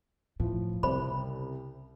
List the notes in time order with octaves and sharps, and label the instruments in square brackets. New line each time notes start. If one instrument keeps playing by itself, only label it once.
[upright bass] A2 [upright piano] F3 E4
[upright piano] C2 [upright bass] C#3 [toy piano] C5 B5